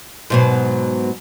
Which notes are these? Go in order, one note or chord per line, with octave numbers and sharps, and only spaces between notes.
G#2 B2 F#3